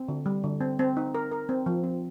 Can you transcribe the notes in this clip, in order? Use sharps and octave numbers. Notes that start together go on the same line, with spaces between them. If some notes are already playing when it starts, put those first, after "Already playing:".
Already playing: C4
D3
G3
D3
C4
C4
D#4
A#4
A#4
C4
F3
C4